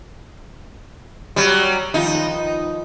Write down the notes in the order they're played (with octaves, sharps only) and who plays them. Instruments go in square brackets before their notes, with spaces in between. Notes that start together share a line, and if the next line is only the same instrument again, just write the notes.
[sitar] F#3 G3
[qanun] D#3 F3 G3 [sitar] D#4
[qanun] B4 D#5